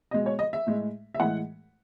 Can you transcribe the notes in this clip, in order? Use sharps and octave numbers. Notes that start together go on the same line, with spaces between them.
B2 G#3 D#5
C#5
D#5
E5
A2 G#3
E5
A2 E3 G#3 F#5